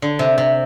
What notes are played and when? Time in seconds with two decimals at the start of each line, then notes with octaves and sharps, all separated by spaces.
0.02 D3
0.19 C3
0.38 C3